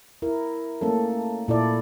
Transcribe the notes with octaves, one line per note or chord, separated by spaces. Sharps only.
E4 A#4
A3 A#3 C#4 A4
A#2 E4 A4 D5